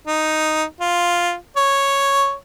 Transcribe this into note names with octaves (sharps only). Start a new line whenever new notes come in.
D#4
F4
C#5